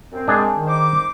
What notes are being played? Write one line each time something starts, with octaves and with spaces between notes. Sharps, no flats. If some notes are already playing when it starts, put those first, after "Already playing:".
F#2 C4
G#3 D4 G#4
D#3
D#4 C5 D6